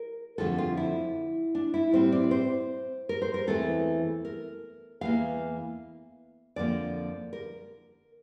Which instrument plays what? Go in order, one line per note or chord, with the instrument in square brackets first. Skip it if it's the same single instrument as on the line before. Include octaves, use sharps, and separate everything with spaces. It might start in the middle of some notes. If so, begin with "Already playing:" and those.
Already playing: [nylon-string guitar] A#4
F2 D3 F3 A3 C4 A4
F4
E4
D4
E4
A2 G3 C4 C5
D5
C5
A#4
C5
A#4
E2 E3 A3 C4 A4
A#4
E2 E3 A#3 F5
F2 D3 F3 A#3 D5
A#4